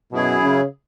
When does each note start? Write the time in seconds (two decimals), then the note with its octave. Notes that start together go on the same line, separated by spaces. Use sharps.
0.12 F#2 B2 F#3 E4 G#4
0.43 C#3